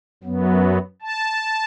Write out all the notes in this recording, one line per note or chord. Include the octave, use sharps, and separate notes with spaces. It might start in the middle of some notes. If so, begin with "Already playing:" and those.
F#2 F#3 B3
A5